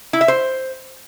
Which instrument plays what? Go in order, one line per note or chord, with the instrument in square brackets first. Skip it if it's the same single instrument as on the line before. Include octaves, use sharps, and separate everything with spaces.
[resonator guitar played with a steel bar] E4
E5
C5